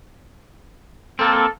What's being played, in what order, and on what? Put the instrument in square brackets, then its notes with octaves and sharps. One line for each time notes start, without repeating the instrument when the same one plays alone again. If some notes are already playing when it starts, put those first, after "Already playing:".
[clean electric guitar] A#3 C4 [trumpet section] A4